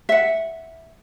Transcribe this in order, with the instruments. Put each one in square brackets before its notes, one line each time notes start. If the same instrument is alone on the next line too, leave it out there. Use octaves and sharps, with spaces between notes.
[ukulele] E5 F#5